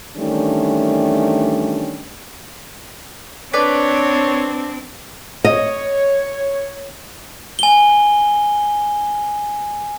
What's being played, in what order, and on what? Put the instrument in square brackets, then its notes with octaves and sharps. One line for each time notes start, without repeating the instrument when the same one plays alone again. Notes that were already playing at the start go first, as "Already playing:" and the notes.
[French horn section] D#3 E3 G3 A3 C#4 D4
[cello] C4 [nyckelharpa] D4 [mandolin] B4 D5 [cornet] C#5
[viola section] C#5 [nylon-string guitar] D#5
[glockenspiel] G#5 G7